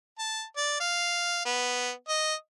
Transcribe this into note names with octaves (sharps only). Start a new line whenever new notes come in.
A5
D5
F5
B3
D#5